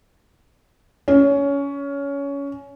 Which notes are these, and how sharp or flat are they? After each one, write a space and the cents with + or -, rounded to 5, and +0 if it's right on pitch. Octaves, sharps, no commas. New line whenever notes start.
C#4 +20